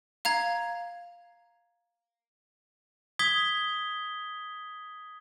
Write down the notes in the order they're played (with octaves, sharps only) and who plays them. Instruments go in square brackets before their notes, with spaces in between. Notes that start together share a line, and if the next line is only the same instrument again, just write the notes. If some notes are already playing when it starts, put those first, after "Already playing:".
[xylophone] F5 A#5 G#6
[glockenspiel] D#6 G#6 B6 G7